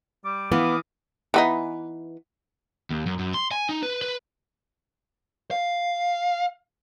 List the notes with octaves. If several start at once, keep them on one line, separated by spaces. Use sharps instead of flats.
G3 D6
E3 B3 F5 D6 D#6
E3 B3 D#4
D#2
F#2
F#2
C6
G#5
D#4
B4
B4
F5